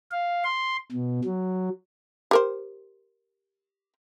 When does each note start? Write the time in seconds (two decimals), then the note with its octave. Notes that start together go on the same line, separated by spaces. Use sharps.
0.11 F5
0.44 C6
0.92 B2
1.24 F#3
2.31 G4 A#4 C5